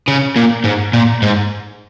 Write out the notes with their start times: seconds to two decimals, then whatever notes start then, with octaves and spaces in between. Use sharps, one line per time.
0.08 C#3
0.36 A#2
0.65 G#2
0.93 A#2
1.22 G#2